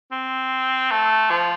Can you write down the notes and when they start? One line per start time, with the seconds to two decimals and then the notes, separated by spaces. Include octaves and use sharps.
0.12 C4
0.91 A3
1.30 F3